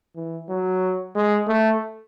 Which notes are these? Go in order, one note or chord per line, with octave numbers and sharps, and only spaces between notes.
E3
F#3
G#3
A3